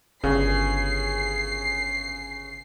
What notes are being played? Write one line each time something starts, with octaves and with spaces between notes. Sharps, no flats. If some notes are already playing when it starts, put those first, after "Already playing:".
G1 C#3 C7